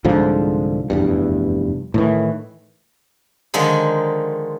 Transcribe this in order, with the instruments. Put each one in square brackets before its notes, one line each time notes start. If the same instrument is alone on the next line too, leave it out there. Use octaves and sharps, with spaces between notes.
[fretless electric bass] C2 G#2 D3 F3
F1 E2 G2
A2 D#3 E3
[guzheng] D3 D#3 F3 G#3 D#4